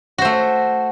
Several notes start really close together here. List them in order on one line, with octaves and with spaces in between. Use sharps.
F#4 C5 A3